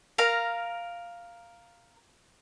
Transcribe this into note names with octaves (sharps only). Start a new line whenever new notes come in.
A#4 F5 A#5